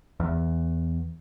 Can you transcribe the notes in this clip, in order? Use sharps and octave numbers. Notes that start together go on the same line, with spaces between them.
E2